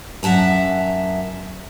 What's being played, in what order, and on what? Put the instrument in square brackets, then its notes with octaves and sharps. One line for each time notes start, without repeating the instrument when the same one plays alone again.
[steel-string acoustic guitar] F#2 E5 F#5 A5 A#5